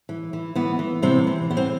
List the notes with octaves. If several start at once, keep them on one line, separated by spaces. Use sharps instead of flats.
E3
E3
E3 B3
E3
C3 E3 C4
E3
E3 B3
C4